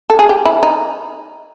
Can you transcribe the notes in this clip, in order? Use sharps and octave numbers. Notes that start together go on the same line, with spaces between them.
A4
G#4
G4
E4
D#4